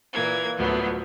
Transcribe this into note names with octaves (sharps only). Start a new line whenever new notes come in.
A#2 E3 A#3 G#6
D2 A2 F3 F#3 B3